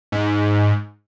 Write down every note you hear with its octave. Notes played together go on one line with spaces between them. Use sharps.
G#2